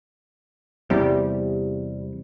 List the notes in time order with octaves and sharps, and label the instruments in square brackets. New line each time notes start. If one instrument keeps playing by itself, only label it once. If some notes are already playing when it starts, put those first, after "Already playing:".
[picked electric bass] E2 C3 [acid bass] G3